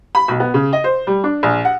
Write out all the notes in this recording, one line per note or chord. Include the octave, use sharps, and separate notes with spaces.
B5
B1
B3
C#3
D#5
C5
G3
D4
A#1
F#5